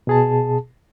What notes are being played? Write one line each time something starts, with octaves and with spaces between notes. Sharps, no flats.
B2 G#4 A5